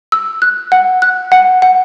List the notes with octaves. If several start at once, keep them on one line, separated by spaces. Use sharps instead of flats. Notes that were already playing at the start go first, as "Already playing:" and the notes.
E6
F#6
F#5
F#6
F#5
F#5